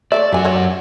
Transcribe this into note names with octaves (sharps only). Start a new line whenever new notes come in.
A3 A4 D5 E5
F#2 F#4 G4 G#5
A#4 C#5 E5
F#5